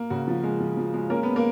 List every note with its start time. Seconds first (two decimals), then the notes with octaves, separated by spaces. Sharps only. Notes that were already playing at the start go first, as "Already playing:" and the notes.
Already playing: A#3
0.10 C#3 F#4
0.28 F3
0.44 G#3
0.60 F3
0.77 F3
0.94 G#3
1.10 A#3 C#4 A#4
1.23 B3 B4
1.36 A#3 A#4